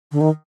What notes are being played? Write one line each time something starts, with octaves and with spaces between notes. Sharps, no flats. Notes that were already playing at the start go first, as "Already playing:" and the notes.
D3
D#3